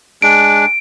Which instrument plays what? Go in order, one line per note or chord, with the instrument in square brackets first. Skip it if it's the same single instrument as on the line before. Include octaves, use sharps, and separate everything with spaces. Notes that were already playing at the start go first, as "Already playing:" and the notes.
[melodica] G#3 D4 [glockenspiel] D7